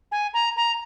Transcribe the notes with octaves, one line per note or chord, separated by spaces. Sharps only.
G#5
A#5
A#5